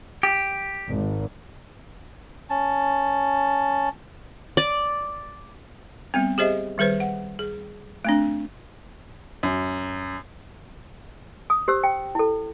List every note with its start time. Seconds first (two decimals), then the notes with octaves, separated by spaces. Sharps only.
0.23 G4
0.88 G#1
2.50 C#4 A5
4.57 D5
6.14 G3 B3 C4
6.38 G4 G#4 C5 D#5 E5
6.78 D#3 G3 G#4 B4 C5
7.00 F#5
7.39 G#4
8.05 A3 C4 D4
9.43 F#2
11.50 D#6
11.68 G4 C5 E6
11.84 G5
12.15 E4 A4